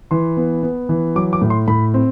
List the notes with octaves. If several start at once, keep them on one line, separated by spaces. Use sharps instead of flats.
E3 C6
B3
B3
E3
F#3 D6
D6
A2
C6
A2 B5
C4